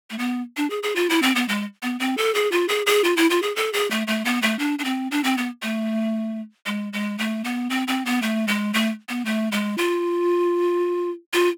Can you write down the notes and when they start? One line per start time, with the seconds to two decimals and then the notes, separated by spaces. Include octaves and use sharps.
0.10 A3
0.19 B3
0.57 D4
0.70 G#4
0.83 G#4
0.96 F4
1.10 E4
1.22 C4
1.35 B3
1.48 G#3
1.83 B3
2.00 C4
2.17 A4
2.35 G#4
2.52 F4
2.68 G#4
2.86 G#4
3.04 F4
3.17 E4
3.30 F4
3.42 G#4
3.56 A4
3.73 G#4
3.91 A3
4.07 A3
4.25 B3
4.42 A3
4.59 D4
4.79 D4
4.85 C4
5.11 D4
5.24 C4
5.38 B3
5.62 A3
6.66 G#3
6.93 G#3
7.18 A3
7.44 B3
7.70 C4
7.88 C4
8.06 B3
8.22 A3
8.48 G#3
8.74 A3
9.09 B3
9.25 A3
9.52 G#3
9.78 F4
11.33 F4